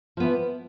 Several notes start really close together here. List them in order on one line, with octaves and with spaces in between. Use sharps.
F3 B3 E3